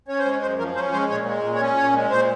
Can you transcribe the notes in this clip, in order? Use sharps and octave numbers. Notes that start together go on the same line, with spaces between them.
C#4 C#5
C5
G#3 C#5
F#2 C5
F3 A#4
C#4 C5
G#3 C5
A#2 C#5
G#3
A#2
C#5
C#4
A#2 C#5
G#3
A#2 C5